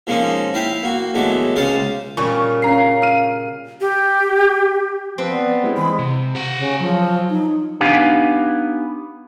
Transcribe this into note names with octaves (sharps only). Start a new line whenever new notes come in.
F3 G#3 A#3 C#4 D#4
E4 F5 G5
A#3 F#4
A#1 E2 F#3 G#3 A3 D6
C#2 C#3 C5 F5 A5 D6
A#2 C#3 G3 C#6
C#4 F5 A#5 C7
F6 D#7
G4
F3 C4 B4
B3 D5
G3 G#3 E4
E3 G#3 B5
C3
G4 F#5
C#3
F3 F#3
D#4
B3 D4 D#4 G4 F5 G#5